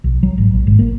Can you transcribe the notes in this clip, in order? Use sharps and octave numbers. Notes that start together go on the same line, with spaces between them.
B1
F#3
G#1
A#1
G#1
A#3